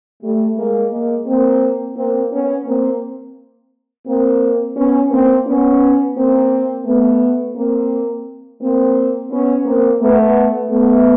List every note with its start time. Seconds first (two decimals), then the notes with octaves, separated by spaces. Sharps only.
0.22 G3 A3
0.56 G#3 A#3
0.91 G#3 A#3
1.26 A#3 C4
1.97 A#3 C4
2.31 B3 C#4
2.66 A#3 C4
4.06 A#3 C4
4.76 B3 C#4
5.11 A#3 C4
5.46 B3 C#4
6.16 A#3 C4
6.86 A3 B3
7.56 A#3 C4
8.61 A#3 C4
9.30 B3 C#4
9.66 A#3 C4
10.01 A3 B3
10.70 A3 B3